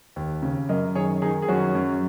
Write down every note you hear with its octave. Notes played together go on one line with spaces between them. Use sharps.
D#2
C#3
F#2 A#4 D#5
D#3 G#4 C#5
D#3 D#4 G#4
G#4
F#2 C#4 F#4
F#2